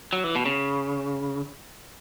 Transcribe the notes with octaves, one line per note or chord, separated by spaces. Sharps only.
F#3
E3
B2
C#3